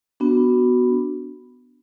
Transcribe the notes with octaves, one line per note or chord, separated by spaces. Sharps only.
B3 D4 F#4